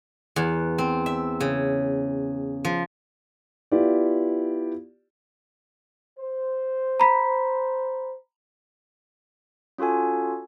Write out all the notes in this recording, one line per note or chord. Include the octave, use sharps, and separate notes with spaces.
E2
C4
E5
C#3
F3
B3 E4 F4 G4 D5
C5
A#5 B5 B6
C#4 F4 F#4 A4 G#5